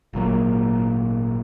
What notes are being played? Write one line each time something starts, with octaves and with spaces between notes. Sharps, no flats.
G#1 A#2 F#3 A#3